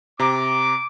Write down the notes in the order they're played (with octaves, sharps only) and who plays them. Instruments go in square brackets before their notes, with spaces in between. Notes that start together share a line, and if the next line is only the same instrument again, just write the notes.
[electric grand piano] C3 A#5 [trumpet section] D6